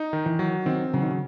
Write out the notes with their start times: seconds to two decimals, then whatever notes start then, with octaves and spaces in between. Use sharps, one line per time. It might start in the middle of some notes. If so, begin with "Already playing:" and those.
Already playing: D#4
0.13 D#3
0.26 E3
0.39 F#3
0.66 D#3 C4
0.93 C#3 F#3
1.02 D#3
1.11 C#3